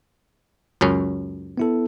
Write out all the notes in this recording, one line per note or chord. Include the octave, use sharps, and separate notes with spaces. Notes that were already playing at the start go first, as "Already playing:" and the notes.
C#2 F#2 C#4
B3 E4 A4